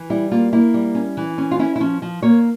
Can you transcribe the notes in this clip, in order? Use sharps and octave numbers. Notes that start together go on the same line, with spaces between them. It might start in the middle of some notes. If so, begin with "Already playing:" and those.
Already playing: E3
G3 E4
A#3 F4
A#3 E4
G3
C#4
E3
C#4
F4
C#4 E4
E4
F3 C#4
F3
A#3 C#5